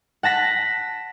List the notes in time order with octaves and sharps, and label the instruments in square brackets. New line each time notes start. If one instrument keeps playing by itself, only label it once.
[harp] F#5 A5 A#6 B6